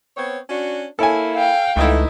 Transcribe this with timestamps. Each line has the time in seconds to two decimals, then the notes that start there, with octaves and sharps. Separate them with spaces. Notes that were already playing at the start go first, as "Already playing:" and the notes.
0.17 B3 C4 C#5
0.49 C#4 D4 F#4
0.99 A#3 E4 A4 C#5 G#5
1.35 F5 G5
1.76 C#2 D3 E3 A3 D#4 E4